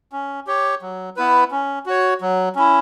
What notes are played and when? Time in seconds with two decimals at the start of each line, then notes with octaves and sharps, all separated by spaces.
0.12 C#4
0.47 G4 C#5
0.82 F#3
1.16 B3 E4 B4
1.51 C#4
1.86 F#4 C#5
2.21 F#3
2.55 C#4 E4